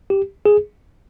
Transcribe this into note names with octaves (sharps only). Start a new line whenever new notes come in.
G4
G#4